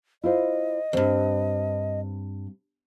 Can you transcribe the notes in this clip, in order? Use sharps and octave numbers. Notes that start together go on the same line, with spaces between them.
E4 F4 C5 D#5
D2 G2 C4